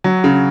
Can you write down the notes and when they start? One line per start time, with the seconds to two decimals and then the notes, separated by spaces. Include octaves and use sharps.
0.04 F#3
0.24 C#3